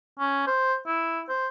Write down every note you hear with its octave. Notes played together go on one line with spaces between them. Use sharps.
C#4
C5
E4
C5